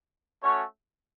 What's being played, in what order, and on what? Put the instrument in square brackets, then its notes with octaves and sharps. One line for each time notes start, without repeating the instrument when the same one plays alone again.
[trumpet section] A3 C#4 F#4 C#5